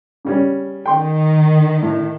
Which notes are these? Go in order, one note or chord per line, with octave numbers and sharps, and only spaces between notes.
C#3 G3 C#4
D#3 G5 C6
A2